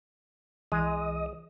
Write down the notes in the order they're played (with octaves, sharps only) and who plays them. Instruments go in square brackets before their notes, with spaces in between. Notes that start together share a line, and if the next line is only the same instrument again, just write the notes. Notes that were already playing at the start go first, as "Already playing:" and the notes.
[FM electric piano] C2 E3 D#6 [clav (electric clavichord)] G#3 [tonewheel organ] D#5